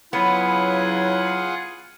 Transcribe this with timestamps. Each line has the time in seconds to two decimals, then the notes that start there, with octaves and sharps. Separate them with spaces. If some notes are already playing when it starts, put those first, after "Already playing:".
0.13 C#3 F#3 B3 E4 F4 G#4 F#5